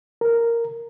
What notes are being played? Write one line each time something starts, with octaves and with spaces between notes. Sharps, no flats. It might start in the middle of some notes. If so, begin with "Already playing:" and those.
A#4